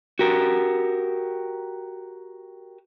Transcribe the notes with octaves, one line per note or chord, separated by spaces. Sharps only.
F#4 G4 A#4